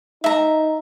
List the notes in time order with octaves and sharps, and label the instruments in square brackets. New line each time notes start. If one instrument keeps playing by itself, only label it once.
[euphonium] D#4 [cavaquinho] E5 A#5